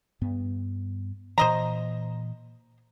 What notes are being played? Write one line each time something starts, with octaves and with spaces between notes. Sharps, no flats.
G2 B3
A#2 E3 C5 D#5 A#5